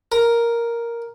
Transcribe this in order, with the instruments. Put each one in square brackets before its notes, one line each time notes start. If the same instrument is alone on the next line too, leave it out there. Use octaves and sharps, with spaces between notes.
[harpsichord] A#4